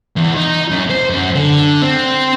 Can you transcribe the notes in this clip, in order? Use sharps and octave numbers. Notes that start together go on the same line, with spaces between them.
E2
D#4
F#2
C5
F#2
D3
C4